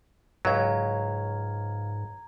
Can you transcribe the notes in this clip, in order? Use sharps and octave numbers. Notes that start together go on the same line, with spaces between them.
C#2 G#2 F#3 C#5 F5 A#5 G#6